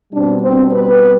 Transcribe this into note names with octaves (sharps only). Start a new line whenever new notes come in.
B2 G3 C4 D4
C4
B4